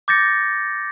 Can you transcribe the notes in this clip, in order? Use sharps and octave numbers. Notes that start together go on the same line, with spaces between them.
D6 G6 A6 A#6 C#7